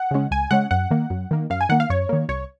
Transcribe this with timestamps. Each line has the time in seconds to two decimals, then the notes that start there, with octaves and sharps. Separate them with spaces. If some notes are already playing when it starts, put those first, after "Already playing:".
Already playing: F#5
0.11 C#3 G#3 C#4
0.31 C#2 G#5
0.51 C#3 G#3 C#4 F#5
0.71 F#2 F#5
0.91 D#3 A#3
1.10 F#2
1.31 D#3 A#3
1.50 F#2 F5
1.61 G#5
1.69 D#3 A#3 F#5
1.80 F5
1.90 F#2 C#5
2.09 D#3 A#3
2.29 C2 C#5